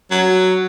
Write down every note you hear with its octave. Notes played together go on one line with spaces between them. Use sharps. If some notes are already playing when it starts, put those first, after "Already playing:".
F#3